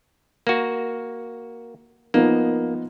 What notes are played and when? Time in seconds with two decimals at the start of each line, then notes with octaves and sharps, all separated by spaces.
0.47 A#3 F#4
2.14 F3 A#3 B3 D#4